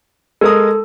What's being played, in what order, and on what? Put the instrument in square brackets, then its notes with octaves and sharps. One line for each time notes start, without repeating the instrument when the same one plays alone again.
[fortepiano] G#3 A#4 D#6 [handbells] A4